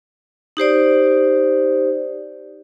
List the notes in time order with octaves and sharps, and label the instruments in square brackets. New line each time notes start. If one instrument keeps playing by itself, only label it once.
[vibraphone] D#4 G4 C5 D5